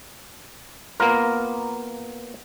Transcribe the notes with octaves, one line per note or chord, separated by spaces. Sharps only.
A#3 B3 F4 A#4